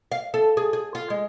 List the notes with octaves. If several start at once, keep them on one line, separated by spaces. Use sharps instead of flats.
F5
A4
G#4
G#4
F4
G#3